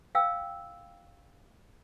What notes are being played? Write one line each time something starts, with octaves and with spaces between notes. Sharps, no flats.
F5 G5 E6